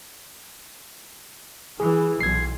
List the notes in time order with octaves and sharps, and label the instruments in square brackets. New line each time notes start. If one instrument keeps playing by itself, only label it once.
[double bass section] E3 [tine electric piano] G#4
[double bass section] B1 [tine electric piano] G#6 C7